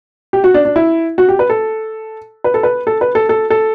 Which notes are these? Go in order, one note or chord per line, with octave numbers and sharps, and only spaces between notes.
G4
F#4
D4
D4
E4
F#4
G4
B4
A4
B4
A4
B4
A4
B4
A4
A4
A4